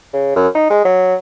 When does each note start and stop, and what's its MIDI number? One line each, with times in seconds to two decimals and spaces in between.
0.13 0.33 49
0.36 0.48 42
0.55 0.70 63
0.70 0.83 56
0.85 1.15 54